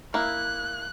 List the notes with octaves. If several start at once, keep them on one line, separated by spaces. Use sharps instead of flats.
A#3 E4 F#6